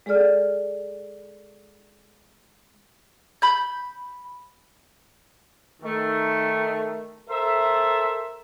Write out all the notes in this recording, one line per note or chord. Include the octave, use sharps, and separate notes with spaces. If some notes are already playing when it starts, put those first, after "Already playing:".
G#3 G#4 A4 D5 F6
B5 G6
D#3 A3
A4 A#4 C5 E5